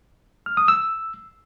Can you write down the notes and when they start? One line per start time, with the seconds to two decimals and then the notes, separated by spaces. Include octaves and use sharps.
0.46 F6
0.57 D#6
0.68 E6